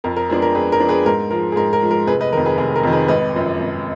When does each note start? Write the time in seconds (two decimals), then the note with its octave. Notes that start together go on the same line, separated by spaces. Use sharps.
0.04 F2 A#4
0.16 A#4
0.29 F3 G#3 B3 D4 G#4
0.42 A#4
0.54 F2 G#4 B4
0.72 A#4
0.80 F3 G#3 B3 D4
0.89 G#4 B4
1.06 G#2 A#4
1.31 F3 G#3 A#4
1.52 G#4
1.56 G#2 A#4
1.73 A#4
1.82 F3 G#3
1.91 A#4
2.07 F1 G#4 B4
2.21 B4 D#5
2.32 D#3 A#4
2.37 F2
2.45 G#4 B4
2.58 F1 G#4
2.76 A#4
2.83 F2 D#3
2.92 G#4 B4
3.08 G#1 B4 D#5
3.34 F#2 F3
3.60 G#1